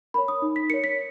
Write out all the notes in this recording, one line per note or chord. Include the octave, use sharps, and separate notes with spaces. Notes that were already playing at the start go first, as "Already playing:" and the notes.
A#4 C#5 B5
D#6
D#4
B6
A#4 C#5 C#7
B6